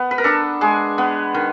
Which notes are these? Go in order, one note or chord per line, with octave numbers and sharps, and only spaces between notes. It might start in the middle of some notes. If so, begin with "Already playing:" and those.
Already playing: B3
B4
A#4
D4 A4
G#3 G#4
B3
D#3